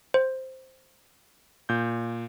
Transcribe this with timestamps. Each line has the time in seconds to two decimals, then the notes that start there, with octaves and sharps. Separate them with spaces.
0.14 C5
1.69 A#2 G6